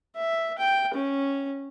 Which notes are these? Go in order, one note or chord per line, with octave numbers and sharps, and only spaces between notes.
E5
G5
C#4